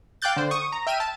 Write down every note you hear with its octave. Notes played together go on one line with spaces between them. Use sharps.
F5 G5 D6 F#6 G6 A6
D3 C5
C#6 D#6
A#5
E5 G5 F6 D#7
A5